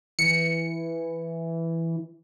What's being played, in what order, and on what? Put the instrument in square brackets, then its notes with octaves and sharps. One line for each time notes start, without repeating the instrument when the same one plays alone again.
[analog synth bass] E3 [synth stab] C#7